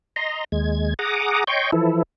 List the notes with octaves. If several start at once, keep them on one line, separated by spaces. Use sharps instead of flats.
D#5 A#5 C6
D#2 G#3 G#6
G#4 F#5 A#5 D6 D#6
C#5 D#5 G5 C6 C#6 G6
E3 F3 E4 A4